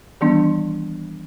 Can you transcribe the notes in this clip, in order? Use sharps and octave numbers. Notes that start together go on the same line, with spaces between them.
D#3 E3 G3 B3 D4 C6